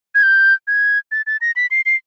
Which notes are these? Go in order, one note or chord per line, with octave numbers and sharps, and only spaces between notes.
G#6
G6
G#6
A6
A6
A#6
B6
C7
C7